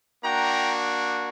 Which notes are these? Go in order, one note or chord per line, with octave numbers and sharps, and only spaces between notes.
A#3 D4 F#4 G5 A#5